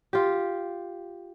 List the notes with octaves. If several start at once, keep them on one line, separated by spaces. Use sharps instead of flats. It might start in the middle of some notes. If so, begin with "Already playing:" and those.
F4 G4